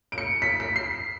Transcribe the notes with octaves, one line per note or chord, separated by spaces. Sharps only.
D7
C#7
B6
B6
C7